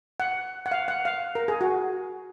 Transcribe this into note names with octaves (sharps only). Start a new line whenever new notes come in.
F#5
F#5
F5
F#5
F5
A#4
G#4
F#4